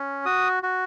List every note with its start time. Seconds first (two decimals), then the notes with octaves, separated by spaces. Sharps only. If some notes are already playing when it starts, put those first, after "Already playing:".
Already playing: C#4
0.25 F#4 D#6
0.63 F#4